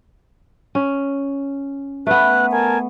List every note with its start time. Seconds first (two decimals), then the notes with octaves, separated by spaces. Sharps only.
0.75 C#4
2.07 A3 B3 B4 F6 F#6
2.51 A#4 G#5 A5